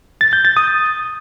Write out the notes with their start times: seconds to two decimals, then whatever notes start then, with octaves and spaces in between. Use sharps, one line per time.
0.21 A6
0.33 G6
0.45 A6
0.57 D#6